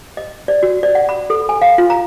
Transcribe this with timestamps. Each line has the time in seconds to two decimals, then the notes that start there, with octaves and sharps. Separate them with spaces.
0.17 D#5
0.48 D5
0.63 F#4
0.83 D5
0.95 F#5
1.09 B5
1.30 A4
1.49 G#5
1.62 F5
1.78 F4
1.90 A#5